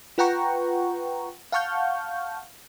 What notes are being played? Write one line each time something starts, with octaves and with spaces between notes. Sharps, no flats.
F4 B4 F#5 G5 A#5 C#6
F5 F#5 A5 C#6 F6 G6